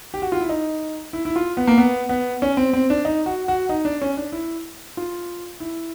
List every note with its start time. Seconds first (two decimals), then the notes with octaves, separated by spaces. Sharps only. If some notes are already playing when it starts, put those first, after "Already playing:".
0.14 G4
0.22 F#4
0.32 F4
0.41 E4
0.49 D#4
1.13 E4
1.25 E4
1.36 F4
1.57 B3
1.67 A#3
1.78 B3
2.09 B3
2.42 C#4
2.57 C4
2.73 C4
2.90 D4
3.05 D#4
3.26 F#4
3.48 F#4
3.69 D#4
3.85 D4
4.02 C#4
4.17 D4
4.32 E4
4.97 F4
5.60 E4